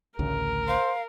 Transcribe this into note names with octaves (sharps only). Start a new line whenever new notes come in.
A1 D2 C#3 A#4
C5 F5